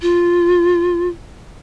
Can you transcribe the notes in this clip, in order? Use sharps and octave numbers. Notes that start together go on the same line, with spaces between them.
F4